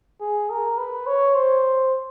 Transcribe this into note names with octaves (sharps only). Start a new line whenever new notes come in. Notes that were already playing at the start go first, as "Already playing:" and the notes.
G#4
A#4
B4
C#5
C5